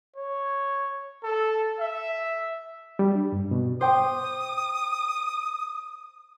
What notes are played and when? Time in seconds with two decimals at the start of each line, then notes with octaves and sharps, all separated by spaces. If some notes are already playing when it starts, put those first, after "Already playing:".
0.16 C#5
1.23 A4
1.79 E5
2.99 G3
3.15 D4
3.32 G2
3.51 B2
3.81 C5 G5 D6 D#6